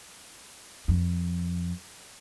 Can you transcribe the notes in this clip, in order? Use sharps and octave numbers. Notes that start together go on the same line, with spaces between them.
F2